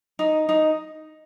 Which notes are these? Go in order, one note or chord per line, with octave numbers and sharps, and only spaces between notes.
D#4
D#4